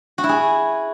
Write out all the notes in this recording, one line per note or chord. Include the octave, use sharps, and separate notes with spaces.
F#4
E4
G#4